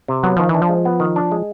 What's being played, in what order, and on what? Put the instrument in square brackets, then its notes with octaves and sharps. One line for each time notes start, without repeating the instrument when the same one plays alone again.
[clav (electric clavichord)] C3
[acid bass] F#3 [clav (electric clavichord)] B3
[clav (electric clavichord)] D#3 [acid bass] F3
[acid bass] E3 [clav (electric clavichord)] D4
[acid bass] F3
[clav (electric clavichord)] G#3
B3
D#3
D4
G#3